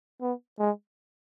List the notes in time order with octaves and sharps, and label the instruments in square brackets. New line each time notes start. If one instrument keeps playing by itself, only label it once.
[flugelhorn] B3
G#3